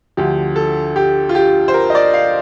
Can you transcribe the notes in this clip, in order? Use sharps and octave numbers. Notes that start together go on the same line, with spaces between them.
D2 D3 F3 G4
A4
G4
F4
G4
C5
A#4
D#5
D5
F5